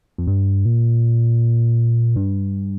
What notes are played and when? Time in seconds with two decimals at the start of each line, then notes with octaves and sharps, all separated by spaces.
0.18 F2
0.27 G2
0.65 A#2
2.16 G2